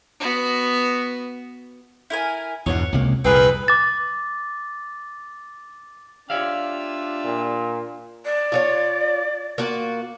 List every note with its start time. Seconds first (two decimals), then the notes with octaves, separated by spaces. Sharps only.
0.20 B3 F#4
2.10 E4 A#4 G#5
2.66 E2 G2 B2 C#5 F#5
2.92 C#2 C3 A#3
3.24 C2 F2 A#2 C4 G#4 A#4 B4
3.68 D6 A6
6.30 D4 F4 G4 C#5 D5 E5 F5 E6
7.25 A#2
8.25 D5
8.52 F4 F#4 C#5
9.58 A#3 F4 F#4